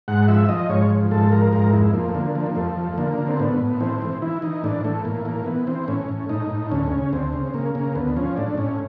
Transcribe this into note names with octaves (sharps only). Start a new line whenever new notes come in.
G#2 F#5
F3 E5
F3 D#5
G#2 C#5
F3
G#2 A4
F3 A#4
G#2 A#4
F2 E4
F3 A#3
A3
D3 A#3
F3 A#3
A#3
F2 A3
F3
D3 A#3
D3
C4
A2 B3
A2
E3 C4
E3
E3 E4
E3 D#4
A2 D4
E3 A3
A2 A#3
E3 A#3
E3 B3
E3 C4
A2 C#4
A2
A2 D#4
A2
D2 C#4
C#3
D2 C4
C#3
C#3 A#3
C#3 A#3
D2 B3
F3 C#4
A2 D4
A2 C#4